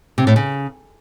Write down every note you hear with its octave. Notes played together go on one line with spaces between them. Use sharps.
C3
A2
C#3